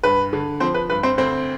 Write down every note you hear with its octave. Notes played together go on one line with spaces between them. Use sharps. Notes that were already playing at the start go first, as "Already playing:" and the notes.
G2 B4
D3
F3 C4 C5
B4
G2 B4
C4 C5
D2 C4 C5